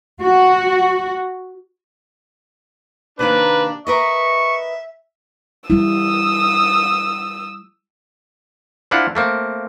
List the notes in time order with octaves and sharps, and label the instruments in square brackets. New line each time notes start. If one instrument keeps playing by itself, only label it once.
[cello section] F#4
[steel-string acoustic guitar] C3 D#3 A#3 [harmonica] D4 [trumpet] B4
[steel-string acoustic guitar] A#4 B4 D#5 [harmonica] E5 [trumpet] C#6
[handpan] G3 E4 [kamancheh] D#6 E6
[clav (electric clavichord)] C4 D4 E4 F4 F#5
A3 A#3 C4